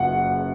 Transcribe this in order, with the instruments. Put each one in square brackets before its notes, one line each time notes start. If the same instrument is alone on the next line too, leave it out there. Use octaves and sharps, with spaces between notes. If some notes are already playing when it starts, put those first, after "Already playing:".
Already playing: [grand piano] F#1 F#2 F#5